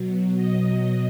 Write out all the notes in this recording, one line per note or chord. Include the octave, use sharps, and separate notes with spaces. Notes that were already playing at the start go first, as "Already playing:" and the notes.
Already playing: B2 F#3
D#5